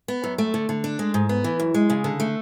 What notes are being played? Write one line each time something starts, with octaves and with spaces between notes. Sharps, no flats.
B3
F#2
A3
D3
D3
D4
G#3
G#2
B3
E3
F#2
G#3
C#3
D3
A3